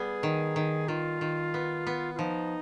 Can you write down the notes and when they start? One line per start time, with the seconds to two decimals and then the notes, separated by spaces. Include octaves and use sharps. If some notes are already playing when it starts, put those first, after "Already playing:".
Already playing: G3 B3 G#4
0.23 D#3
0.56 D#3
0.88 D#3 F4
1.21 D#3
1.54 B3
1.87 B3
2.14 F4
2.19 F3 D#4